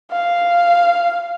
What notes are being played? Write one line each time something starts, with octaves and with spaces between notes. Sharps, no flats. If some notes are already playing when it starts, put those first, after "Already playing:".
F5